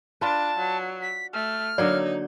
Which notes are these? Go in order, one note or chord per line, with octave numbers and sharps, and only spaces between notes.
D4 F4 B4 A5
F#3
B6
A3 F6
D3 F#3 A#3 D#4 C#5 D5